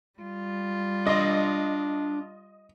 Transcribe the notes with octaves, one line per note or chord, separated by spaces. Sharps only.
G3 F4
D4 D#5 C6